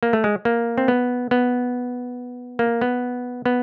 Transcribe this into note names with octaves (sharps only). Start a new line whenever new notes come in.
A#3
A3
G#3
A#3
C4
B3
B3
A#3
B3
B3